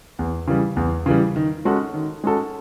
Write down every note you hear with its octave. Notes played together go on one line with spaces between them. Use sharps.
E2
C#3 E3 G3
E2
C#3 E3 G3
D#3
G#3 C#4 F#4 A4
D#3
G#3 C#4 F#4 A4